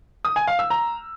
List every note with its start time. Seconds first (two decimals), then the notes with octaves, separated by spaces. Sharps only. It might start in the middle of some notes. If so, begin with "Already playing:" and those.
0.25 D#6
0.36 G#5
0.47 F5
0.59 E6
0.70 A#5